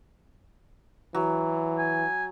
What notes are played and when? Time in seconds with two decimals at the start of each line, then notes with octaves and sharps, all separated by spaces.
1.15 E3 F#3
1.78 G#5